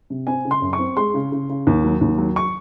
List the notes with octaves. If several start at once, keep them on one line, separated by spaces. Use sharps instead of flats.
C3
C4 G#5
C#3
C6
F#2
C#6
C4
G#3 C6
C#3
C#3
C#3
D#2
F#3
D#2
F#3
C#6